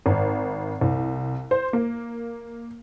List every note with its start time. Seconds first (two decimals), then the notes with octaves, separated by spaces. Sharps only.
0.06 G#1
0.81 C2
1.51 C5
1.73 A#3